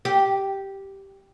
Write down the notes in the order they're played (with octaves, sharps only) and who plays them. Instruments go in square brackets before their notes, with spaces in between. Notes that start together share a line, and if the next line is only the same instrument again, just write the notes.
[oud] G4